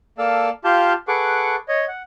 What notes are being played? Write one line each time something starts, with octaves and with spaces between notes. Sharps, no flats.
A#3 A4 D5 F5 A5 E6
F4 G4 F5 A5 G6
G#4 A4 B4 F#5 C#6 D6
C#5 D#5
F#5